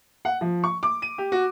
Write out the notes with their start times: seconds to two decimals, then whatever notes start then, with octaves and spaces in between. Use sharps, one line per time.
0.25 F#5
0.41 F3
0.64 C#6
0.83 D6
1.02 D#7
1.18 G4
1.32 F#4